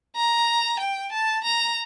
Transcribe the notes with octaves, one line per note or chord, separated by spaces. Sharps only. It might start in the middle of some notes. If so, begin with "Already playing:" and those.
A#5
G5
A5
A#5